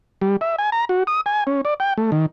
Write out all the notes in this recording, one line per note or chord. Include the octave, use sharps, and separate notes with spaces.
G3
E5
G#5
A#5
F#4
D#6
G#5
C#4
D5
G5
A3
D#3